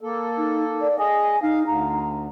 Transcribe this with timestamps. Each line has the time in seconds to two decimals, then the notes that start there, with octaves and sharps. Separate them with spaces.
0.01 A#3 A4
0.37 D#4
0.81 D5
0.99 G#4 D#5 G#5
1.42 D#4 F5
1.67 D2 A#5